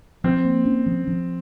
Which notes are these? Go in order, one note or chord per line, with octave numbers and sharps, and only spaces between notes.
F3 C4
A#3
C#4
F3
F3